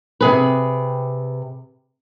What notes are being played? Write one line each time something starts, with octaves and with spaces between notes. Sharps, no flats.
C3 G#4 B4